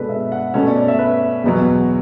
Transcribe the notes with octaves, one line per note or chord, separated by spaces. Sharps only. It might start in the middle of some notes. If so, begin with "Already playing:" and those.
Already playing: B2 G#3 D4 A4 B4
E5
F#5
B2 A3 C#4 E5
D5
D5
E5
B4
E2 B2 F#3